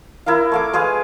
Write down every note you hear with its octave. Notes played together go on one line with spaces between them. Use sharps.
E4 A#4 D#5 F5
A3 F5 D6
G#3 G#4 B4 F5